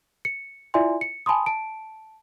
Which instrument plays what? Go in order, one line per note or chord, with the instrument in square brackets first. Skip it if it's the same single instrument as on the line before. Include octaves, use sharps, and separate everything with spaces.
[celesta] C#7
E4 F4 D5 E5 G#5 C6
C#7
G#5 A5 B5 C6 D#6
A5 D7